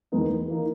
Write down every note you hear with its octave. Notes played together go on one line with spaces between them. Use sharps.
E2 D#3 G#3 B3 D#4
E3 A#3 D#4